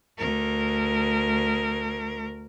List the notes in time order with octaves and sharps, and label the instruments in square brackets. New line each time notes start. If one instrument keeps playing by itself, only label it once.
[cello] D2 A#4